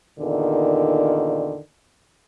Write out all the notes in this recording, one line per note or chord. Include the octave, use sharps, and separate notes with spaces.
E2 A#2 D3 D#3